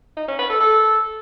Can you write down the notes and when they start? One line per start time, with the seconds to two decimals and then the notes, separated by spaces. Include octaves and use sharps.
0.17 D#4
0.28 C#4
0.39 B4
0.50 A4
0.61 A4